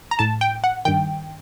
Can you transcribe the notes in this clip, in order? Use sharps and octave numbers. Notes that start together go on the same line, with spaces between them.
A#5
A2 A5
G5
F#5
G2 D#3 G5